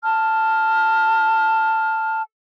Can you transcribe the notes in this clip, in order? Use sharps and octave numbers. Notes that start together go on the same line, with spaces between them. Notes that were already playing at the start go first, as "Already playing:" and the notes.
A5 F6